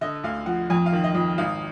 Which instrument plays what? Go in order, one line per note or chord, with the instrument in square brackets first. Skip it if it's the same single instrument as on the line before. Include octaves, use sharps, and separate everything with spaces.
[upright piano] D3 D#5
D2 F5
F3 F#5
F2 G#5
F5
D#3
D#5
F2
G#1 F5